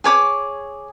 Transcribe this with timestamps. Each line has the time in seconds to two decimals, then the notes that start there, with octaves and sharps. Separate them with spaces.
0.04 G#4 C#5 D6